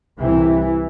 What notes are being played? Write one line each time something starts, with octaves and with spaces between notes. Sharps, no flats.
C2 C3 E3